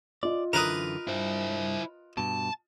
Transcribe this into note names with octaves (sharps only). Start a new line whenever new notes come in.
F4 D5 D#5
F#2 D3 E3 A#4 B4 D#6
G2 E4 C5
G2 B2 A5